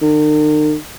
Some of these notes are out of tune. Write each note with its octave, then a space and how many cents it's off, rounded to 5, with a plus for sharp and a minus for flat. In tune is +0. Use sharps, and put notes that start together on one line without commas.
D#3 -45